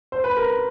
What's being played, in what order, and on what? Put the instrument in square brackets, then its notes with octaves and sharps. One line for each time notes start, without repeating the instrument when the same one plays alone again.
[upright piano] C5
B4
A#4